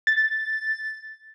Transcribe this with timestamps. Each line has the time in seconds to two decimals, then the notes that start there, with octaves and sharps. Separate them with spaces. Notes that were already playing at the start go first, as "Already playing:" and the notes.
0.07 A6